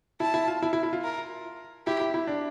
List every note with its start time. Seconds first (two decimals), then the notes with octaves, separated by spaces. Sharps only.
0.20 E4 A5
0.34 E4
0.48 F4
0.62 E4
0.73 E4
0.83 E4
0.93 F4
1.04 A#4
1.87 E4 G4
2.00 E4
2.14 E4
2.27 D4